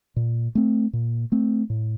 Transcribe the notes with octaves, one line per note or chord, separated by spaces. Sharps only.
A#2
A3 C4
A#2
A3 C4
A2